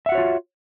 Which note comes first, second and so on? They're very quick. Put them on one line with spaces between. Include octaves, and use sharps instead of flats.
E5 F#5 F#4 C#5 F4